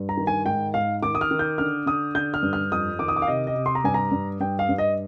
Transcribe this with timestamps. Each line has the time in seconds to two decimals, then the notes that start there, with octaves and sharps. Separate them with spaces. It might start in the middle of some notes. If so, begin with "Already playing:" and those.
Already playing: G2
0.09 A#5
0.17 D#3
0.27 G#5
0.46 G#2 G5
0.74 G#2 F5
1.02 D#3 D6
1.15 D#6
1.21 F6
1.31 D#3
1.39 G6
1.58 D3 F6
1.86 D3 D#6
2.15 D3 G6
2.34 F6
2.43 G2
2.53 F6
2.72 F2 D#6
2.99 D#3 D6
3.08 D#6
3.16 D6
3.22 F5
3.27 C3 D#5
3.47 D#5
3.55 C3
3.66 C6
3.75 A#5
3.84 G2 G#5
3.94 A#5
4.12 G2
4.40 G2 G5
4.59 F5
4.69 G2
4.78 D#5